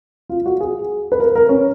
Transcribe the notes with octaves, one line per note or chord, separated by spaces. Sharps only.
F4
F#4
G#4
B4
A#4
A#4
C#4